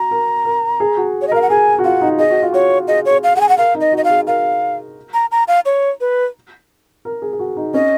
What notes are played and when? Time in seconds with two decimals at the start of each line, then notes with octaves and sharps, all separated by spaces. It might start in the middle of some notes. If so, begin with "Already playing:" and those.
Already playing: F#4 A#5
0.11 A#4
0.45 A#4
0.80 G#4
0.97 F#4
1.22 C#5
1.28 D#5
1.32 A#4 F5
1.42 F#5
1.50 G#4 G#5
1.79 F#4
1.84 F4 F#5
2.02 D#4
2.18 G#4 D#5
2.30 F#4
2.42 F4
2.53 F#4 C#5
2.88 G#4 D#5
3.05 C#5
3.11 G#4
3.24 F5
3.35 G#4 F#5
3.41 G#5
3.49 F#5
3.58 A#4 F5
3.75 D#4
3.81 D#5
3.92 F#4
3.97 D#5
4.04 F5
4.10 G#4
4.27 A#4 F5
5.14 A#5
5.32 A#5
5.48 F5
5.66 C#5
6.01 B4
7.05 A#4
7.22 G#4
7.33 G#4
7.39 F#4
7.57 D#4
7.74 C#4 D#5